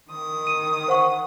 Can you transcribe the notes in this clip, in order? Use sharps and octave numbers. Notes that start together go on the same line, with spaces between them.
D#3 D#6
D#7
C5 F#5 C#6